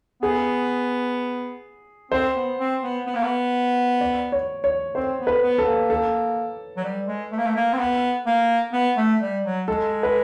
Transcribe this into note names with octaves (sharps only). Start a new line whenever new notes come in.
B3 G#4
C4 C5
B3
C4
B3
B3
A#3
B3
D5
C#5
C#5
C4 C5
B3
B4
B3
A4
A#3
A4
F#3
G3
G#3
A3
A#3
A3
A#3
C4
B3
A#3
B3
A3
G3
F#3
G#3 A4
B4